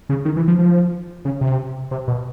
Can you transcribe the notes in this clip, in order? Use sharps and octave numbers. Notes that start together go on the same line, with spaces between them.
C#3
D#3
E3
F3
F3
C#3
C3
C3
B2